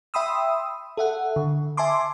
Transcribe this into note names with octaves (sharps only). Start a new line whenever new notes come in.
E5 G5 B5 C6 D#6 E6
A4 E5 F#5
D3
E5 G#5 A5 C6 D6